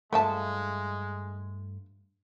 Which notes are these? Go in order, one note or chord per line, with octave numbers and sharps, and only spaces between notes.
G2 F3 G#3 A3 E5 A5